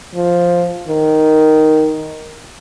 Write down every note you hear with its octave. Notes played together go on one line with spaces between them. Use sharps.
F3
D#3